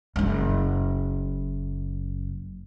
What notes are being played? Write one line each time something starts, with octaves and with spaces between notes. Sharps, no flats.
F#1 F#2